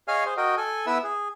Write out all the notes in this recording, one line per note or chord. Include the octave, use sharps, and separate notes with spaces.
G#4 C#5 D#5 F5 G#5 F6
G#4 C5
F#4 A#4 D#5 G5
A4 G#5
B3 E4 B4 E5 E6
G#4